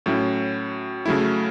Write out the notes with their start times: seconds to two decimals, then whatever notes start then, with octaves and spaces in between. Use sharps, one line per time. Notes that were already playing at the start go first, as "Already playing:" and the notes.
0.06 A2 F#3 C#4 E4
1.06 C#3 F#3 A3 E4